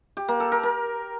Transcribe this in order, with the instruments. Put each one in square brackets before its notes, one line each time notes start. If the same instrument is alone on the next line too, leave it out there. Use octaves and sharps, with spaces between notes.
[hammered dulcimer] G4
A#3
A4
A#4
A#4